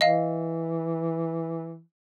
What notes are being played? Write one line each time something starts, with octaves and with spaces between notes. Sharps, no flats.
E3 D#5 F5